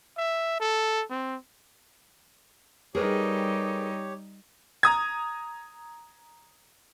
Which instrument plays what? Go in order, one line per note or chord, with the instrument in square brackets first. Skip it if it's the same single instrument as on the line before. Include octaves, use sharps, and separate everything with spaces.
[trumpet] E5
A4
C4
[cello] G3 D#4 [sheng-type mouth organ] G4 C#5 [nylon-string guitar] G#4 A#4 B4
[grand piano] A#5 D#6 G#6